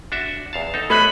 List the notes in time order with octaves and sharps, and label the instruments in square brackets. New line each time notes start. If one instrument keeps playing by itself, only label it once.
[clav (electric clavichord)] D4 F#4 E5
E2 F5 A5
D#4 A4
[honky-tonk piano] A3 F#6 D#7 [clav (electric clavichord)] C#4 D#4 C5 [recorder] B5